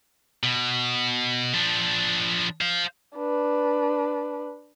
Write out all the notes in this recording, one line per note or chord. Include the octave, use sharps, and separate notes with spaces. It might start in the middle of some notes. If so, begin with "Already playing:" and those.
B2
F3 D4
C5 F5
D4 B4